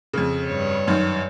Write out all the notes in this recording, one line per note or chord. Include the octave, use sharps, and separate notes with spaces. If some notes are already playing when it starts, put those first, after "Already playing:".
F2 C#3
G2 C#5
F#2 D#3